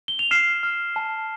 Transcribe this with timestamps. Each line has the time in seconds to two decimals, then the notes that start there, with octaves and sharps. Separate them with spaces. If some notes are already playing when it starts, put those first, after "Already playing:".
0.08 G7
0.19 F7
0.31 F6 C7 E7
0.63 F6
0.96 A5